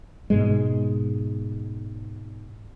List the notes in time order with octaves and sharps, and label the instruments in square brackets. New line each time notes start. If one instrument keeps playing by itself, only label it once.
[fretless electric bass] G#2 B2 G#3